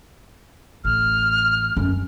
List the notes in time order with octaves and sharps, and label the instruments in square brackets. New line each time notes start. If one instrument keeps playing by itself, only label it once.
[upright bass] A1 [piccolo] F6
[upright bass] F#2 C#4